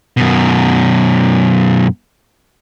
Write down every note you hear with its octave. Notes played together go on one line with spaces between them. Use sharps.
F#2 B2